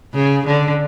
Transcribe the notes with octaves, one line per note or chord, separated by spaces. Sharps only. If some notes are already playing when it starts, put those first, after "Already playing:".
C#3
D3